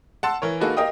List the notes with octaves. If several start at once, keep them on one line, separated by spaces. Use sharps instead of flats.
F#5 A5 C6 E6
E3 A#4 C#5
A#3 D#4 F#4 G#4 A4 B4
G4 A#4 D#5 F5 G5 D#6